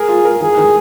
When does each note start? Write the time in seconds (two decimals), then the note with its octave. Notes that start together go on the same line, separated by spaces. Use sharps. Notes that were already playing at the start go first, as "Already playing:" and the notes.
Already playing: G#4 A#4
0.09 F4
0.25 A#4
0.41 D#3 G#4
0.57 D#3